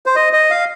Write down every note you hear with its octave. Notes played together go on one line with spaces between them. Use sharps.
C5
D#5
D#5
F5